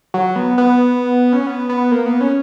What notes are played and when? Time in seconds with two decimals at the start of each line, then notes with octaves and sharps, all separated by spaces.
0.14 F#3
0.36 B3
0.58 B3
1.33 C#4
1.47 B3
1.69 B3
1.92 A#3
2.06 B3
2.21 C#4